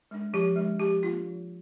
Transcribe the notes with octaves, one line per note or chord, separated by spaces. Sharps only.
G#3 D4
F3 G4
G#3 D4
F3 G4
A#3 D4 F4
F3